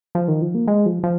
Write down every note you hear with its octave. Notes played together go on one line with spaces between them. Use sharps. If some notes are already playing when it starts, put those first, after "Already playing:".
F3
D#3
F3
A#3
G#3
F3
F3